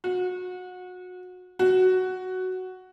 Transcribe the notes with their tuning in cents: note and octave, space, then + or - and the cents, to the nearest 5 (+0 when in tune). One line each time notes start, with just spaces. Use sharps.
F#4 -30
F#4 +5